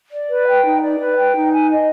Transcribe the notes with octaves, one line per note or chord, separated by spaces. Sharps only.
D5
B4
G5
D#4
D5
B4
G5
D#4
G#5
D#5